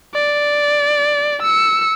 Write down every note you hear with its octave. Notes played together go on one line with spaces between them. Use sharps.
D5
E6 C#7